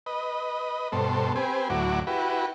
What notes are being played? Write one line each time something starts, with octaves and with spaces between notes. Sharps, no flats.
B4 D#5
G2 B2 A4 C5
C4 G4 B4 G#5
D2 A2 F#3 E4 F#4 D6
E4 F#4 G4 B4